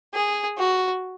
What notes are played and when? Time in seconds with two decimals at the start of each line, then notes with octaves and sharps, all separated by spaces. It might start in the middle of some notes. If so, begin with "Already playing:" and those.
0.14 G#4
0.58 F#4